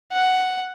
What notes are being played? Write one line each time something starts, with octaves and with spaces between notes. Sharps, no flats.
F#5